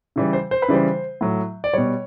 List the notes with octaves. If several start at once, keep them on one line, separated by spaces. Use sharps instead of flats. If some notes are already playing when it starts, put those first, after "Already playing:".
C#3 E3 G3
C5
C5
B4
C#3 E3 G3 C5
A2 F#3
D5
B2 G3 C#5